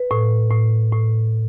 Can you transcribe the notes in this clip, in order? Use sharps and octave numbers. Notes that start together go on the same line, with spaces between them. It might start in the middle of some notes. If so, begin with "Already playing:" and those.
Already playing: B4
A2
A2
A2